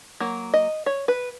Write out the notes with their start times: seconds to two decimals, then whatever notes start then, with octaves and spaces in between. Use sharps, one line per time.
0.20 F#3 A#3
0.54 D#5
0.86 C#5
1.08 B4